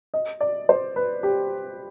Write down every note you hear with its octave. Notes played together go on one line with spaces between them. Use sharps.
D#5
D5
C5
B4
G4